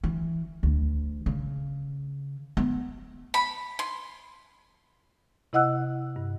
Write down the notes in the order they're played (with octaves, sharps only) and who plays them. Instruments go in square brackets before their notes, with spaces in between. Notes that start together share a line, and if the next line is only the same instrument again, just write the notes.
[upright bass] E3
D2
C#3
B3
[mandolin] B5
C6
[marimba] C3 E4 D#5 F#5 E6 F#6
G2